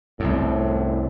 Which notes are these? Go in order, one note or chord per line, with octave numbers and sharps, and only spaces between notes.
C2 F#2 A2